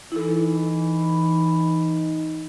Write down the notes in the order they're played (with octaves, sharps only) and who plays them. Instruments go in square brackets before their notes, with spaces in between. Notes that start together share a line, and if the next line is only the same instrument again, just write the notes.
[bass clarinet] E3 [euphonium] D#4 [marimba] E4 A4